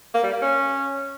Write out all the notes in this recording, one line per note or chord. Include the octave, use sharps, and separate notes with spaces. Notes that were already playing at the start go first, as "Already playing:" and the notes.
A#3
G3
A#3
C#4